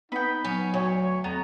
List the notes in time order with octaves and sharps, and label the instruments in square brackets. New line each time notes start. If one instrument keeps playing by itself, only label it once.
[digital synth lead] B3 [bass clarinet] D#4 [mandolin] G5 B5
[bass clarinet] F#3 [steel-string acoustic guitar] C#4
[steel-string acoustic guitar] D2 [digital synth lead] C#5
[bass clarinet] F2 [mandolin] B3 [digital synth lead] A#5